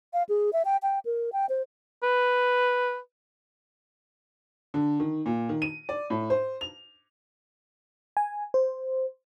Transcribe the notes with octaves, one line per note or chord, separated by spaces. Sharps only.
F5
G#4
E5
G5
G5
A#4
G5
C5
B4
D3
D#3
A#2
D#3
D#7
D5
A2
C5
F7
G#5
C5